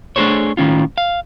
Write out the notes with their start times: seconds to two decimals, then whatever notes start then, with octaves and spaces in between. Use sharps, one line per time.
0.16 A3 D4 D#4 G#4 C5 C#5
0.57 A2 D#3 C#4 F4
0.98 F5